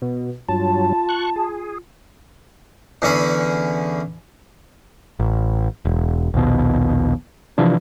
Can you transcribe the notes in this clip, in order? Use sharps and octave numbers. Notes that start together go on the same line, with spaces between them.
B2
G2 F#3 F4 A5
C#6 F#6
G#4
E2 D3 C#4 B5
A1
E1
A#1 D#2 B2
C3 E3 F3 D4